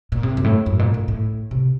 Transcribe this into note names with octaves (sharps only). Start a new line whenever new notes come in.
A#2
C3
F#2
A2
F#2
A#2
A2
A2
C3